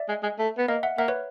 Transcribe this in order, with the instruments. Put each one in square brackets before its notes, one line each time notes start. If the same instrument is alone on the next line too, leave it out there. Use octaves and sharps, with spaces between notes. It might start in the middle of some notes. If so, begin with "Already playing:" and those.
Already playing: [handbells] D5 E5
[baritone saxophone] G#3
G#3
A3
B3
[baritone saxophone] A#3 [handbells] D#5 F5
[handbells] E5 F#5
[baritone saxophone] A#3 [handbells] E5 F#5
[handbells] B4 C#5